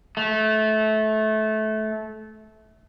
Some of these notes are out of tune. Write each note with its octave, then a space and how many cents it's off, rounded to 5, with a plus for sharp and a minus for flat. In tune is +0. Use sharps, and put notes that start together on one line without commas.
A3 -20